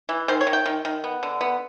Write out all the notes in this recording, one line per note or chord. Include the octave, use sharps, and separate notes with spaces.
E3
D#3 C5
C#5
D#3
G5
D#3
D#3
B3
D3
B3